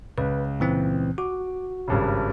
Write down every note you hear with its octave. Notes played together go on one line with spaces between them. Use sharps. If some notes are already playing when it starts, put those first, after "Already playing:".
C#2 B4
A#2 E3 C4
F#4 D6
G#1 G2 C#3